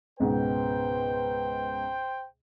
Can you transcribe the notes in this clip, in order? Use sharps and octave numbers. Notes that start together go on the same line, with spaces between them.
C#2 G#2 B2 B4 C5 G5